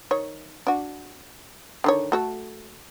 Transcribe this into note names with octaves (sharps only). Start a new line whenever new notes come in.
D#3 C#5
D4 F#4
D3 D#3 C#5
A3 F#4 A4